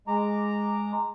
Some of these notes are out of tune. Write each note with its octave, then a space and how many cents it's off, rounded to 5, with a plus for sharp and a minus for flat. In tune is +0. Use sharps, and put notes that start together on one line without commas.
G#3 +0 A#5 -10 D6 +0